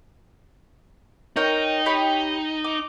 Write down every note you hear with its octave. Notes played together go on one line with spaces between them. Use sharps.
D#4 A#4 C#5 G5
G4 C#5 B5
D6